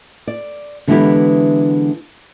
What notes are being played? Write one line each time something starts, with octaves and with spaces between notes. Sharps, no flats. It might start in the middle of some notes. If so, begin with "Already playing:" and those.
D5
D3 E3 G#3 B3 E4 G4